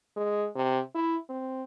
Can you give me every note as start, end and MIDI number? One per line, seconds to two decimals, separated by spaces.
0.17 0.47 56
0.56 0.80 48
0.95 1.16 64
1.29 1.63 60